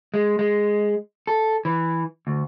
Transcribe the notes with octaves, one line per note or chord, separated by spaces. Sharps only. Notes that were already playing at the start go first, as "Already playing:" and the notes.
G#3
G#3
A4
E3
D2